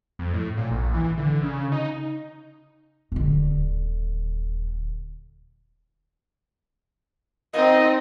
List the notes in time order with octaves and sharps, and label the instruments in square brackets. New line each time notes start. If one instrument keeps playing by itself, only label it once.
[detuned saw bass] F2
A2
A#2
A#1
E3
D3
C#3
D#4
[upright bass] D#1 D3
[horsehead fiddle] C4 D#4 [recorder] D#5